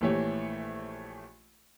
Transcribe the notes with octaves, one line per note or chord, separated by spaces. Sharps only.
A#1 E3 A3 G4 C#5